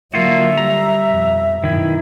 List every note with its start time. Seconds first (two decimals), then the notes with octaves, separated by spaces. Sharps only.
0.14 D3 F#3 A#3 F4 F#4 E5
0.58 G3 A#5
1.08 F2 B2
1.64 F#2 B2 D#3 E4